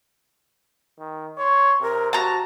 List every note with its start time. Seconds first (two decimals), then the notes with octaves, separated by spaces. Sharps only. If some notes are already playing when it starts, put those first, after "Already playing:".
1.00 D#3
1.38 C#5 C6
1.82 C3 A#4
2.13 F#4 A5 A#5